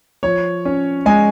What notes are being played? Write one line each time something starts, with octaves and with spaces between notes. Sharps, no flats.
F3 C#5
C#4
G#3 G#5